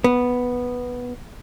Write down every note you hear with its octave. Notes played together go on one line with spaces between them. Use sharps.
B3